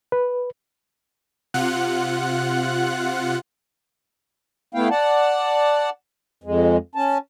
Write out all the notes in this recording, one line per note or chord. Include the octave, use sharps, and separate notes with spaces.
B4
C3 F4 F#5 F#6
A3 B3 E4 F5 G5
D5 F#5 A5
F2 G#3
C#4 A5